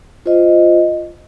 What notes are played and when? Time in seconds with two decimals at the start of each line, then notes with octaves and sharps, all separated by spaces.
0.26 F4 C5 D#5